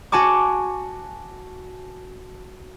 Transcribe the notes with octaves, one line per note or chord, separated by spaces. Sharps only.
F#4 G#5 A5 C#6 D6